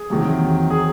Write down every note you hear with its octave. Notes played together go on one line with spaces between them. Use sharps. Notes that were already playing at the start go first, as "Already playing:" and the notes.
Already playing: G#4
E2 C3 D#3 F#3
G#4